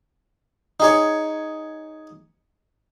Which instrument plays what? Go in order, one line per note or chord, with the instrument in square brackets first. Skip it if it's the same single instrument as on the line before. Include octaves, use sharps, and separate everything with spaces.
[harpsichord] D#4 G#4 C#5